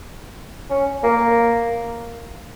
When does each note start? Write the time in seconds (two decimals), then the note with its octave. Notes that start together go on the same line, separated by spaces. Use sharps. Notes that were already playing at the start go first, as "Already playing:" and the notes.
0.70 C#4
1.03 A#3